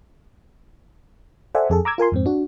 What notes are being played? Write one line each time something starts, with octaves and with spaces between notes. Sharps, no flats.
A4 C5 D5 E5 F#5 G#5
F2 G#4 A4
A#5 D6 E6 G#6
F4 A#4 G#5 C6
F2 G#2 C4
D4 F#4